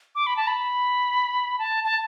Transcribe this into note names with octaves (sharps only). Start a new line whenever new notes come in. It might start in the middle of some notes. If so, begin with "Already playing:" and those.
D6
B5
A5
B5
A5
A5